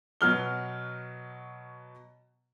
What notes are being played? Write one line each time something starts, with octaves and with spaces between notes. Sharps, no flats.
B2 F#3 F6 G7